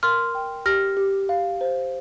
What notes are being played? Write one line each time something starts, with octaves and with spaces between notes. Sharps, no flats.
A#4 C6 F6
G5
G4 F6 A#6
G4
F5
C5